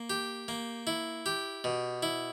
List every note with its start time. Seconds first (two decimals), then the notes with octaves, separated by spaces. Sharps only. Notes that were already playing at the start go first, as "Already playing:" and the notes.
Already playing: A#3
0.10 G4
0.48 A#3
0.87 E4
1.26 G4
1.64 B2
2.03 E4